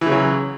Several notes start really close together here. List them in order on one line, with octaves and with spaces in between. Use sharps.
E3 C#3 F#3